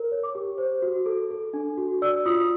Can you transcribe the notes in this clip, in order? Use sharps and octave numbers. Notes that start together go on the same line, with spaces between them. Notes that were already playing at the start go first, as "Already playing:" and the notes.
Already playing: A#4
C#5
D6
G4
C5
F#4
A4
A4
D4
F#4
D5 E6
F4 D#6